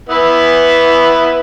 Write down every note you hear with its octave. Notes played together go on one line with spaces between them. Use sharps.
B3 E4 B4